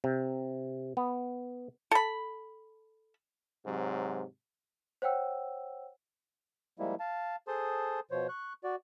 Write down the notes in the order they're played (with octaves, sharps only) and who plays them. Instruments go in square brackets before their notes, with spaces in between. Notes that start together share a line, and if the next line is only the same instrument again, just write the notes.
[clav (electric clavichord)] C3
B3
[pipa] A4 B5
[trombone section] G#2 C3 F#3
[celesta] C5 C#5 F#5 G5 E6
[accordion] F3 G3 G#3 A#3 E4
F5 A5
G#4 A4 C5 A5 C6 D#6
B2 F3 C5 C#5
C#6 F#6
F#4 D5